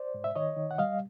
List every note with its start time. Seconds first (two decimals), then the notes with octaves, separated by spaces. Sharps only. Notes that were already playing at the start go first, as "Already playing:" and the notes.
Already playing: C5 D5
0.14 G#2
0.24 E5
0.36 D#3 C#5 D#5
0.57 D#3
0.71 F#5
0.78 G3 D#5 F5